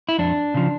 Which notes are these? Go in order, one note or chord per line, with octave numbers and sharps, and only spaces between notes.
E4
F2 D4
C#3 F3